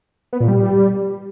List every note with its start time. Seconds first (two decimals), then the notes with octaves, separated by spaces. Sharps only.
0.33 B3
0.40 A#2
0.48 G3